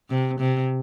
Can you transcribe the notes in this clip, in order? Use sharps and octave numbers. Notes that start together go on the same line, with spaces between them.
C3
C3